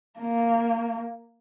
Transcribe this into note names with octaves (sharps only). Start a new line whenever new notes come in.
A#3